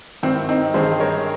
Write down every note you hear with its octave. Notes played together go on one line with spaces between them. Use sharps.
G#1 G2 D#3 C4
C4 D#4
G#1 G2 D#3 G#4 C5
A#4 C#5